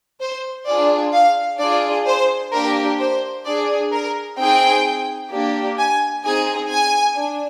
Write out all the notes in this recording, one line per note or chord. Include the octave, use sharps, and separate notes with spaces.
C5
D4 F4 G#4 D5
F5
D4 F4 G#4 D5
C5
A#3 D4 G4 A#4
C5
D4 G#4 D5
A#4
C4 D#4 G#4 G5
A#3 D4 G4
G#5
C4 D#4 G#4 G#5
G#5
D4